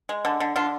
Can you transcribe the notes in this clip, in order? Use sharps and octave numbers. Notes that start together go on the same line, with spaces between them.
G#3
D3
D3
D3 D4 F4